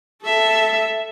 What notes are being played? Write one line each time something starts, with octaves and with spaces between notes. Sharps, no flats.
A4 E5